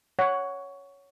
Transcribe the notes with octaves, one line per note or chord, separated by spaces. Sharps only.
C#5 F#5